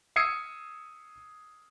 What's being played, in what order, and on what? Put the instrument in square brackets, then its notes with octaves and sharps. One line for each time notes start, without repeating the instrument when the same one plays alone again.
[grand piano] D#6 E6 G#6 C7 C#7 D#7